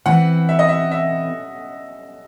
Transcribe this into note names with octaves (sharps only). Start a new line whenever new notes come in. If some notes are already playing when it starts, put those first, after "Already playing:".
E3 C4 E4 F#5
E5
D#5
E5
E5